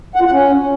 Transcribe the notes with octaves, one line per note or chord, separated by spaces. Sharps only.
F#5
F4
F#5
C#4